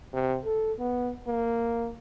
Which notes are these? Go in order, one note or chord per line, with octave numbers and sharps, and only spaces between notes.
C3
A4
B3
A#3